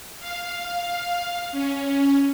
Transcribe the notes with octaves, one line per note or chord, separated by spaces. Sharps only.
F5
C#4